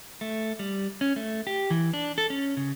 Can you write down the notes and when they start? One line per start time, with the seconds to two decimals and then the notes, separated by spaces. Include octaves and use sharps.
0.21 A3
0.59 G3
1.01 C#4
1.16 A3
1.47 G4
1.71 E3
1.93 D4
2.18 A4
2.30 C#4
2.57 C#3